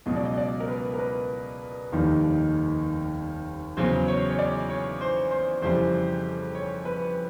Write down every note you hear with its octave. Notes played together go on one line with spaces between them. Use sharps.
C#2 B2 F#3 D#5
D5
D#5
D5
A#4
B4
A#4
B4
F1 D#2 D#3 G3
E2 C#3 F#3 C5
C#5
C#5
D5
C#5
C5
C5
F2 C#3 E3 G3 C5
C#5
B4